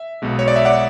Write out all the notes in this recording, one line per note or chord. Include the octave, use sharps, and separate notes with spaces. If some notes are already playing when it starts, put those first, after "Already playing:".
Already playing: E5
B1 B2 G#3
C#5
D5
E5
D5 F#5